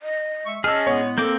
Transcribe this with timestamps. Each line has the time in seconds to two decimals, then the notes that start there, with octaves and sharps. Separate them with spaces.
0.02 D#5
0.46 G#3 E5 C#6
0.64 C#4 G#4 D#5 A5 E6 F6
0.87 A2 G#3 B3 C#5
1.18 A#3 C4 A4 D6 G6